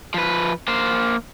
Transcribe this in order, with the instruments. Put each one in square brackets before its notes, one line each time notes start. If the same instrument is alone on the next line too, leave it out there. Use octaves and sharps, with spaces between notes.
[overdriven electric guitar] F3 B4
A#3 C5